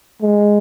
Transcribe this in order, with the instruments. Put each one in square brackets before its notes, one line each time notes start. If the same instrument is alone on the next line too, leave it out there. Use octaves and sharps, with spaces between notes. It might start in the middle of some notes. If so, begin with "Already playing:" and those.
[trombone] G#3